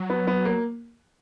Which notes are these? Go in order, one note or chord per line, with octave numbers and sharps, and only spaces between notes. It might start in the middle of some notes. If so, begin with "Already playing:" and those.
Already playing: F#3
B3
B3
A#3